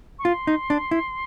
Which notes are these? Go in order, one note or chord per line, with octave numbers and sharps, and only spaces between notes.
C#6
F4 C6
D#4
D4
E4